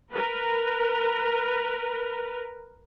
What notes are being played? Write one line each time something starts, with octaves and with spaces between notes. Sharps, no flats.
A#4 B4